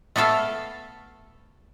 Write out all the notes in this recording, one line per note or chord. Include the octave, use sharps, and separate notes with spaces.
A3 B3 A4 E5 F5